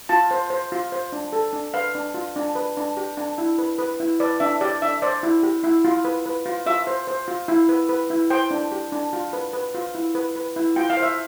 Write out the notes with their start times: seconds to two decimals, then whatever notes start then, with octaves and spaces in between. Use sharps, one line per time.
0.09 F4 A5
0.31 C5
0.50 C5
0.72 F4
0.92 C5
1.12 D4
1.33 A4
1.53 D4
1.74 B4 F5
1.95 D4
2.14 F4
2.36 D4
2.55 B4
2.77 D4
2.97 G4
3.17 D4
3.38 E4
3.58 B4
3.79 B4
4.00 E4
4.20 B4 D5
4.40 D4 E5
4.61 G4 D5
4.82 D4 E5
5.02 C5 D5
5.23 E4
5.43 G4
5.64 E4
5.85 F4
6.05 B4
6.26 B4
6.46 F4
6.66 F4 E5
6.87 C5
7.07 C5
7.28 F4
7.48 E4
7.69 B4
7.89 B4
8.10 E4
8.30 C5 G5
8.51 D4
8.72 G4
8.92 D4
9.13 F4
9.33 B4
9.53 B4
9.75 F4
9.95 E4
10.15 B4
10.36 B4
10.56 E4
10.76 F4 G5
10.90 F5
10.97 C5
11.03 E5